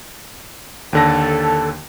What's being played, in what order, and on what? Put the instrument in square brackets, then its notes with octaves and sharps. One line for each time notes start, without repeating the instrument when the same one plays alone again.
[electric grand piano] D#2 D3 A#6 [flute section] A4